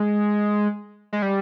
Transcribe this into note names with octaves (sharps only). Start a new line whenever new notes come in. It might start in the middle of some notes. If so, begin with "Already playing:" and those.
Already playing: G#3
G#3
G3